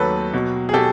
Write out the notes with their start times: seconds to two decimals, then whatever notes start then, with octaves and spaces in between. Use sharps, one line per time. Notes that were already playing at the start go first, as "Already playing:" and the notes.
Already playing: D#2 D#3 F#3 A3 A4 B4
0.34 B2
0.69 G#4
0.73 B2 G4 A4